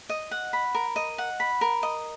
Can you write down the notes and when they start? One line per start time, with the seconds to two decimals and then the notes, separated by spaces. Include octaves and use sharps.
0.09 D#5
0.31 F#5
0.53 B5
0.75 A#4
0.96 D#5
1.18 F#5
1.40 B5
1.61 A#4
1.83 D#5